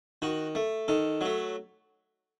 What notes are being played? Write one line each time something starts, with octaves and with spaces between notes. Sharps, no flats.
D#3 F#4
A3
D#3 A4
F#3 A3